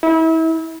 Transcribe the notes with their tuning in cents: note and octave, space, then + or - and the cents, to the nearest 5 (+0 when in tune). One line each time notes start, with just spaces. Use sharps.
E4 -30